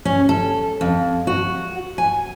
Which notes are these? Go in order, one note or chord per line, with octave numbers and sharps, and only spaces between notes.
C#4
A4
F2
F#4
G#5